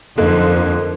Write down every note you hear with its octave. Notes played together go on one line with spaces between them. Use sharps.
F2 D3 A#3 D#4